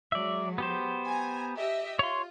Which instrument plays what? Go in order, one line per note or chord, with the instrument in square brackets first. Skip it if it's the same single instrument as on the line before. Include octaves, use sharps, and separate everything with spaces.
[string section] F#3 G#3 [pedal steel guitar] D5 E5
[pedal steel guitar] B3 G4 C5
[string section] G#5 A#5
G4 D#5 E5
[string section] F4 [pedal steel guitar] C#5 C6